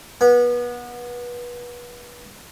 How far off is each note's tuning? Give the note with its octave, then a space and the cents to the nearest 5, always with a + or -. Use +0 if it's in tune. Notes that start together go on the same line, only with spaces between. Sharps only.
B3 -25